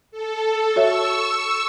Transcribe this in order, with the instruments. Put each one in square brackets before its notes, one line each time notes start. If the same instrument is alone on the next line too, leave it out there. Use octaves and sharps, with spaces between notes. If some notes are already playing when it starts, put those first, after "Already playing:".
[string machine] A4
[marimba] F#4 C#5 E5 [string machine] C#6 E6